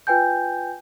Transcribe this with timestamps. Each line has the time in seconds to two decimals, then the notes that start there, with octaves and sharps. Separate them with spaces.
0.07 F4 B4 G5 G#5 G6